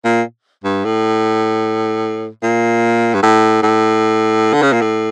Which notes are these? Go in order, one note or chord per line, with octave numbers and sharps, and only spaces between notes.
A#2
G2
A2
A#2
G2
A2
A2
D3
C#3
A#2
A2